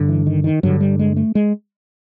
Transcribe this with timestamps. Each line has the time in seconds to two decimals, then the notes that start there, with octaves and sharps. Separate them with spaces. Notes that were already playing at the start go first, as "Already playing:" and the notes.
Already playing: G2 D3
0.09 E3
0.26 D#3
0.44 D#3
0.63 G2 D3 F#3
0.81 G3
0.99 G#3
1.17 A3
1.35 G#3